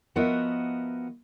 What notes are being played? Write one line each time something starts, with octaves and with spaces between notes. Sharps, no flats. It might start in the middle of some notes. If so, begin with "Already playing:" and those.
F3 B3 F#4 A#4 D#5 E5